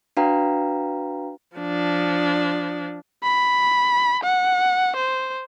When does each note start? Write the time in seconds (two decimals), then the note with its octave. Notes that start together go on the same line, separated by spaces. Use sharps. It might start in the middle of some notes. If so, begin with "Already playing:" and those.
0.17 D4 F#4 B4 F5 G5 A#5
1.57 F3 D4
3.23 B5
4.24 F#5
4.97 C5